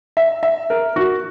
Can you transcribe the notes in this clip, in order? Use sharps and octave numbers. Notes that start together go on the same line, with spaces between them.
E5
E5
A#4
F#4